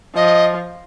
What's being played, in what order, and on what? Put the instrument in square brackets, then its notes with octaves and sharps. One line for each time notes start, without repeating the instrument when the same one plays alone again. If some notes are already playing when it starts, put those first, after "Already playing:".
[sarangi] F3 [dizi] D#5